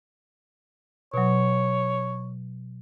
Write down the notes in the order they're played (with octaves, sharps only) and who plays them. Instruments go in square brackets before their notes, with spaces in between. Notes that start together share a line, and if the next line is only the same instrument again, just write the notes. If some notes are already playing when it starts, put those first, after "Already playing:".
[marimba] B2 F#3 [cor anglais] C#5